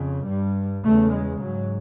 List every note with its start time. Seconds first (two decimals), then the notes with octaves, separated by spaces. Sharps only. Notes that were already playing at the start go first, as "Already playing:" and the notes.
Already playing: F2 C#3
0.27 G2 G3
0.84 E2 C#3 A3
1.12 G#3
1.40 G#2 F#3